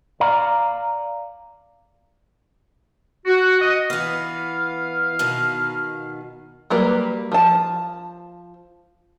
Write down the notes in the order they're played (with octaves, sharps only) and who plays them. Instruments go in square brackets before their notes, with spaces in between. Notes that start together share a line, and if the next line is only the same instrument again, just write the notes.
[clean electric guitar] D5 F5 A#5
[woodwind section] F#4
D#5
[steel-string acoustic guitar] E3 B3 [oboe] F5
[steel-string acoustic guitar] B2 D#3
[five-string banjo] F#3 G3 A#3 B4
F3 A5